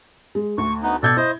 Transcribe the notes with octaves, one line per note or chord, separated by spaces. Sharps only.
G#3
D2 C#6
B3 D#4
B2 A4 D5 G6 G#6
E4 C5 D#5